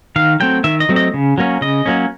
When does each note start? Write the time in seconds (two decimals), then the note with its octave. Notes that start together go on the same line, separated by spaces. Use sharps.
0.16 D#3 F5
0.40 F#3 A3 C4 G5
0.64 D#3 E5
0.80 D#5
0.89 F#3 A3 C4
0.96 D#5
1.14 C#3
1.38 F#3 A#3 C#4
1.61 C#3 D#5
1.86 F#3 A#3 C#4